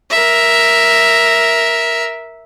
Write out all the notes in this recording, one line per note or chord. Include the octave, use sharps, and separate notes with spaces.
A#4 E5